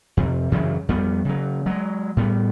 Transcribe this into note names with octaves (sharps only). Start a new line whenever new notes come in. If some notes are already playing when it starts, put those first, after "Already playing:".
F2 C3
F#2 C#3 E3 F#3
F2 G3 B3
C#3 F#3
F#3 G#3
A2 G3 B3